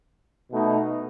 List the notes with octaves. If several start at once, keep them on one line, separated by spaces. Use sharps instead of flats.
B2 A3 D#4